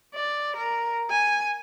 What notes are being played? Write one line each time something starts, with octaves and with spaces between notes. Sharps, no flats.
D5
A#4
G#5